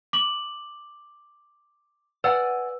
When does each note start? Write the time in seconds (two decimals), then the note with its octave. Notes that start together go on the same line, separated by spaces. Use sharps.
0.13 D6 F#7
2.24 B4 D5 F#5 G#5 E6